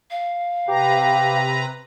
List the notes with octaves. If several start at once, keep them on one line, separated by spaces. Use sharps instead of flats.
F5
C3 G4 B4 A#5